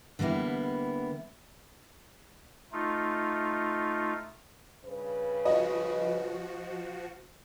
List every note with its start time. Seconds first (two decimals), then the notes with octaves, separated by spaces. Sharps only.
0.19 D3 G3 A#3 B3 E4
2.72 A3 D#4 F4
4.85 G2 C#3 B4
5.45 F3 F#4 D#5